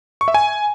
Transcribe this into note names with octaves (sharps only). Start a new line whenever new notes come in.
C#6
E5
G#5